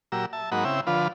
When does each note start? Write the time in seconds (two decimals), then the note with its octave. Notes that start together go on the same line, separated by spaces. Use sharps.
0.12 A#2 F#3 G4 A#5 E6
0.33 E5 A5
0.52 G#2 F#3 A#3 D#4 F#5 B5
0.65 C#3 C4 E4 E5 G5
0.87 D3 F3 F4 B4